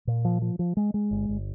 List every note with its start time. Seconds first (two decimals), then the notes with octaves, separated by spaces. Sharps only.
0.07 A#2
0.25 F3
0.42 F3
0.59 F3
0.77 G#3
0.94 G#3
1.11 G1
1.29 G1